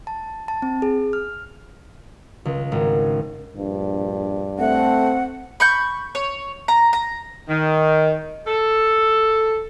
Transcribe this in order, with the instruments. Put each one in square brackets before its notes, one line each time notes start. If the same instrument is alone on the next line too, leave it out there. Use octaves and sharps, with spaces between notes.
[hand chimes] A5
A5
C4
G#4
F6
[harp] C#2
G#1
[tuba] A#1 [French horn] G2
[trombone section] A3 [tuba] C4 [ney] F#5
[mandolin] B5 C#6 G6
C#5
A#5
A#5
[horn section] D#3
A4